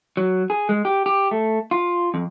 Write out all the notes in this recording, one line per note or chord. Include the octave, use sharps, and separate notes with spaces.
F#3
G#4
G#3
G4
G4
A3
F4
F2